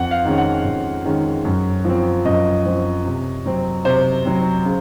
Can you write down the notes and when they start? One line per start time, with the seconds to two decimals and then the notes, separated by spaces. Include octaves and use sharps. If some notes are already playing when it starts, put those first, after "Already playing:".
Already playing: F2 F#5
0.11 F5
0.25 D#3 G#3 C#4
0.38 F#5
0.64 F2
1.05 D#3 G#3 C#4
1.45 F#2
1.85 F3 C4
2.25 F#2 D#5
2.65 F3 C4
3.05 C3
3.46 F#3 C4
3.85 C3 C5
4.25 F#3 C4
4.65 C#3